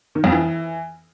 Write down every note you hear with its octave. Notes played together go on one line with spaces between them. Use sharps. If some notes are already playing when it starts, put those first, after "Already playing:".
D#3
F2
E3